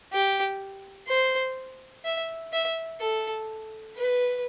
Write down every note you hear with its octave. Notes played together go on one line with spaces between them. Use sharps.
G4
C5
E5
E5
A4
B4